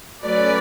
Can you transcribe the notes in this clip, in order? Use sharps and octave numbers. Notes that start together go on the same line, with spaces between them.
F#3 A3 C#4 B4 D5